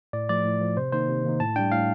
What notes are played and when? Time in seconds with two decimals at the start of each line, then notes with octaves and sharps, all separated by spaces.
0.13 A2 D5
0.29 F3 A3 D5
0.45 A2
0.61 F3 A3
0.77 C3 C5
0.92 D#3 A#3 D#4 C5
1.09 C3
1.24 D#3 A#3 D#4
1.40 A2 A5
1.56 G3 D4 G5
1.72 A2 F5